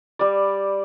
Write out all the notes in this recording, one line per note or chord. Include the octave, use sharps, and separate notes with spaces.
G3 D5